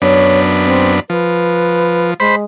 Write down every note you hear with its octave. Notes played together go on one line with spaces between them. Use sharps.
F#2 B3 D4 C#5
C4
F3 B4
G#3 C5 B5